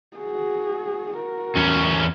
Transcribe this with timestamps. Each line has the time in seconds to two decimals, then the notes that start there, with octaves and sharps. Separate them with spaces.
0.17 F#4 G#4
1.14 F#4 A#4
1.57 E2 C#4